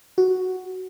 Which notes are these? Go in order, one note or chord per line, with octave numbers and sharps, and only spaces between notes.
F#4